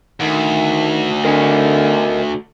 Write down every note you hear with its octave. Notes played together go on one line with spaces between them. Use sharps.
D2 D#3
D3 A#4 D#5 G#5